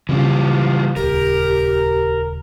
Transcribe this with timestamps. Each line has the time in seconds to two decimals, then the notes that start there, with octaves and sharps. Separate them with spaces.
0.09 C#3 E3 G3 C4 C#4 F4
0.96 D#1 C#2 G4 A#4